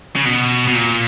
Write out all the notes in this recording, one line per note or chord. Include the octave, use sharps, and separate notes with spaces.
C#3
B2
B2
A#2